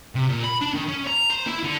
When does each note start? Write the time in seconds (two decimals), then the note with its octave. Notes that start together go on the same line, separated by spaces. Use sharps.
0.15 C3
0.29 A#2
0.44 B5
0.62 D4
0.74 D#3
0.89 C#4
1.07 A#5
1.30 C5
1.47 E4
1.64 D3